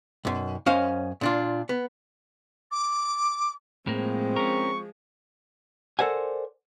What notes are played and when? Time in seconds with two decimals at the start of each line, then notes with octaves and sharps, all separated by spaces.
0.25 B1 F#2
0.66 F#2 C#4 C5 D#5 F5
1.21 A#2 D4 F4
1.69 B3
2.71 D6
3.87 A2 F3 G#3 A#3 C4
4.36 C#4 A#4 C#6
5.99 A4 A#4 C5 D5 F#5 G#5